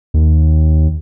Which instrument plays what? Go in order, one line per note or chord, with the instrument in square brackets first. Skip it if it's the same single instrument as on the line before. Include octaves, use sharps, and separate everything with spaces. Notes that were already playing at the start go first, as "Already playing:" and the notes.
[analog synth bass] D#2